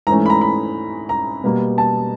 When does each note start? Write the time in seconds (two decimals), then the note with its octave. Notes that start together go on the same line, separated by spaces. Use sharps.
0.07 G#2 E3 A3 C#4 A#5
0.26 B5
0.30 A#5
0.41 B5
1.09 A#5
1.44 B2 G3 A#3
1.78 A5